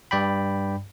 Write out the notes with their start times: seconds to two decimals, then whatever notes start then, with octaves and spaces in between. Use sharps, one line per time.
0.11 G2 D5 G5 B5